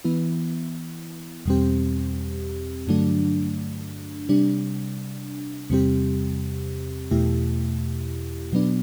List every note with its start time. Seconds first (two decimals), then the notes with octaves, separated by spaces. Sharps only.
0.04 E3 B3 E4
1.45 E2 B2 G3 C4 G4
2.87 G2 D3 F#3 A3 D4
4.29 C3 G3 D4
5.70 E2 C3 G3 C4 G4
7.11 E2 B2 A3 E4 G4
8.52 B2 F#3 B3 D4